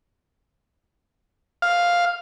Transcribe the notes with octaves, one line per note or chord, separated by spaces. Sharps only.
F5